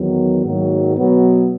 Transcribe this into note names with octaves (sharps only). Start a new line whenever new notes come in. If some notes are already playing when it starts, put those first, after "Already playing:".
Already playing: E2 D#3 F#3 B3
G#2 D#3 F#3 A#3
B2 F#3 B3